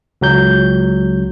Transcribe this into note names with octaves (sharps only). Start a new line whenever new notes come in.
C#2 F#3 G6